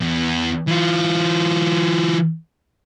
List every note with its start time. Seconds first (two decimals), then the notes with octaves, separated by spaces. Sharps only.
0.01 E2
0.67 E3 F4